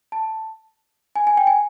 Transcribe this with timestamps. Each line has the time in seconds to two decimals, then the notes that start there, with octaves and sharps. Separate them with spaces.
0.12 A5
1.16 G#5
1.27 G#5
1.37 G5
1.47 G#5